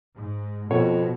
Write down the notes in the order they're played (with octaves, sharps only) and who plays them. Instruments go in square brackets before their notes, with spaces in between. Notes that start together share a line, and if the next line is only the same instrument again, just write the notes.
[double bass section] G#2
[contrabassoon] F2 [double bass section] B2 [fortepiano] C#5